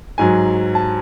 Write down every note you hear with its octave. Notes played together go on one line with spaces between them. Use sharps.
G#2 F#3 G#5
A5